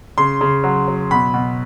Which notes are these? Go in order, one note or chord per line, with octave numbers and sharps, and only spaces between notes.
C#3 C6
C#3
F#3
F#3
B2 B5
B2